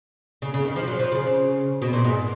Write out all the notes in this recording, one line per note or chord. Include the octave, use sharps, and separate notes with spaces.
C#3
C#3
D#3
F3
F#3
F3
C#3
B2
A#2
G#2